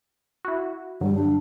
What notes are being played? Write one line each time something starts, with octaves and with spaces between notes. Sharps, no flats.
E4 F#4
G2 D3 F#3 G3
D4